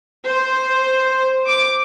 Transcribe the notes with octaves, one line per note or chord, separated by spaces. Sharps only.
C5
D6